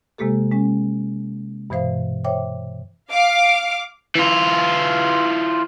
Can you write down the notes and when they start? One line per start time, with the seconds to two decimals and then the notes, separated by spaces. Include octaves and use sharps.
0.18 C3 G#3 A#3 G4 A4
0.51 G#3 C#4
1.70 G2 B2 E3 C5 F5
2.24 C5 C#5 E5 G5 D6
3.10 F5 D6
4.15 E3 F4